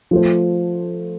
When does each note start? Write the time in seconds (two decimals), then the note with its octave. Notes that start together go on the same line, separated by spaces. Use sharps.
0.11 F3 A3 F4 C5